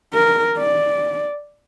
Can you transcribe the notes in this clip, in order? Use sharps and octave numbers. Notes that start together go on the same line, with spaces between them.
A#4
D5